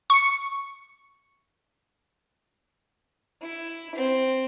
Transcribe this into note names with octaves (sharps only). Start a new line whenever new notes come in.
C#6 C#7
E4
C4